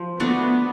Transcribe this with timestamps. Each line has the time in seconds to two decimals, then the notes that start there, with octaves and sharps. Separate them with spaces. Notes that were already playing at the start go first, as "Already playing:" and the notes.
Already playing: F3
0.20 A3 B3 D4 F#4